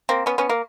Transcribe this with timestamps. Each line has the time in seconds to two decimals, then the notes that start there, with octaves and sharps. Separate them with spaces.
0.09 A#3 C4
0.26 B3 C#4
0.38 B3 C#4
0.49 A#3